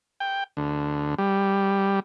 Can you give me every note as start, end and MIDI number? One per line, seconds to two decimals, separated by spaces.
0.20 0.44 79
0.57 1.15 38
1.18 2.00 55